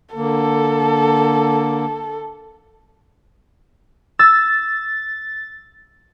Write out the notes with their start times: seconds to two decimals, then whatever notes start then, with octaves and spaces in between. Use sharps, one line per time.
0.15 D3 A#3 A4
4.19 E6 A6